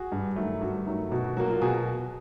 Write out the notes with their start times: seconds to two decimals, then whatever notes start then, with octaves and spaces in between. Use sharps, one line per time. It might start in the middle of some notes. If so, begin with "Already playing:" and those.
Already playing: F#4 G#4
0.12 G2
0.36 D#3 F#3 A3
0.61 G2 F#4
0.86 D#3 F#3 A3
1.12 B2 F#4
1.24 F#4
1.37 F#3 A#3 F#4
1.49 F4
1.61 B2 F#4 G#4